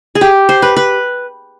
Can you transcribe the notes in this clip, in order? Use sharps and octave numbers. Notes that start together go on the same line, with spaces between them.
G#4
G4
C5
B4
B4